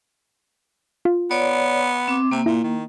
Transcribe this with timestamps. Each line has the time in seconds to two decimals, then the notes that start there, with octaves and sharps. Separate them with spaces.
1.05 F4
1.31 B3 C#5 D5
2.08 C4 D6
2.31 C3 A#3
2.46 A#2 E4
2.64 D#3